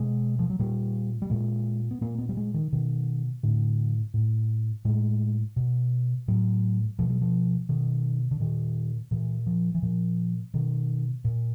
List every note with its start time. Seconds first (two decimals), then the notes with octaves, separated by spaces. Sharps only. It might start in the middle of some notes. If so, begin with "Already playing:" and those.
Already playing: B2 G#3
0.39 F3
0.50 F#3
0.59 A#2 G3
1.22 G3
1.30 A#2 G#3
1.91 B3
2.01 A#2 A#3
2.18 B3
2.29 G3
2.37 G#3
2.54 D#3
2.72 B2 D#3
3.43 A2 D3
4.14 A2
4.85 A2 G#3
5.56 B2
6.28 A2 F#3
6.99 B2 F3
7.10 F#3
7.21 F3
7.69 B2 D#3
8.31 D3
8.40 A#2 D#3
9.11 A#2 E3
9.47 F3
9.75 E3
9.82 A#2 F3
10.54 B2 D#3
11.24 A#2